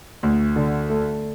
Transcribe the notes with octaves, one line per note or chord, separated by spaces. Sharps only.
D2
D3
A3